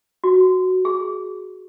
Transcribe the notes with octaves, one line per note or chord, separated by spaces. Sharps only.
F#4
G#4